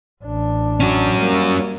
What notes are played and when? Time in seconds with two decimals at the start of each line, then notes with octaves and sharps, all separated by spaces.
0.23 A1 D4
0.80 C#4 F#4
1.15 G3 A#3